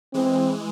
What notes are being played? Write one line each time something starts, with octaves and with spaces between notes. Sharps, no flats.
E3 G#3 C4